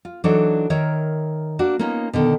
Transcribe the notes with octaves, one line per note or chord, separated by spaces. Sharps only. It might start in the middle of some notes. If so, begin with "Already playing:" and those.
F4
E3 F#3 D4 D#4 A4 C#5
D#3 A#4 C#5 E5
A#3 D4 F#4
A#3 B3 C#4 D#4 F4
B2 D3 D#3